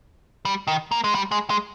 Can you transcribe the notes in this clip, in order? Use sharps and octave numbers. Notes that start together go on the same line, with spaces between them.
G3
D#3
A#3
G#3
G3
G#3
G#3